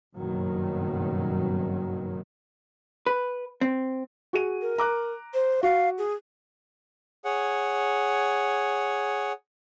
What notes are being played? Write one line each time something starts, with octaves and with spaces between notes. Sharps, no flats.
F#1 G2 B2 D#3 F#3
B4
C4
F#4 G#4 D#7
A#4
A#5 D6 F#6
C5
F#4 F5
G#4
G#4 C#5 F#5